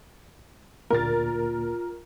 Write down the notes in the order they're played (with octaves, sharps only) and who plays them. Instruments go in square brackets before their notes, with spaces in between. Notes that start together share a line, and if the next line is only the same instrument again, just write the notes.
[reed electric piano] D2 A#2 A#3 [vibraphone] F4 [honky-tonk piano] A#4 A6